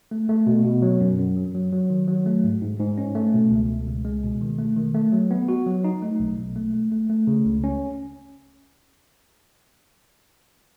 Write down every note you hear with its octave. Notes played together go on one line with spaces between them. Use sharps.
A3
A3
B2
B2
F#3
F#2
F#2
F#3
F#3
F#3
D#3
F#3
A3
G#2
G#2
G#2
C#4
A3
B2
C#2
C#2
C#2
G#3
B2
D#3
A3
D#3
A3
F#3
B3
F#4
F#3
D#4
A3
B1
B1
A3
A3
A3
A3
C#3
C#2
C#4